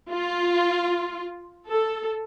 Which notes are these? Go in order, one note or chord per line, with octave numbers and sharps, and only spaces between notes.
F4
A4